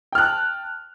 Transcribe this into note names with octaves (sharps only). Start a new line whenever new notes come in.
G5 A5 F6 F#6